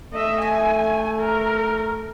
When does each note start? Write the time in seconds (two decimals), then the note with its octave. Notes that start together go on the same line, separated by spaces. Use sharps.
0.13 A3 D#5 E5
0.42 E5 G#5
1.21 A#4